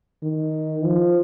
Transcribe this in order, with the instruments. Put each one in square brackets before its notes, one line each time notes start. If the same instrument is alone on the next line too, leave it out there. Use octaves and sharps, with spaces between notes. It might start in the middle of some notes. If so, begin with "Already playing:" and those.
[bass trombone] D#3
F3